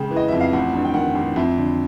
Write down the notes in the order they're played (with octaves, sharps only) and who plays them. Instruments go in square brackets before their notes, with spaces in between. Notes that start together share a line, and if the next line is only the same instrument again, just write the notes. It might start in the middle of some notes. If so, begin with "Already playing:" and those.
Already playing: [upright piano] C#3 G#3 G5
E3
D#5
F2 E5
F5
A1 F#5
G2
G5
D#3 F#5
A1
F2 E5
D3